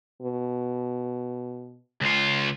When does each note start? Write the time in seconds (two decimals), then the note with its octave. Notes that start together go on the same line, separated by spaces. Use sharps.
0.22 B2
2.01 C#2 F4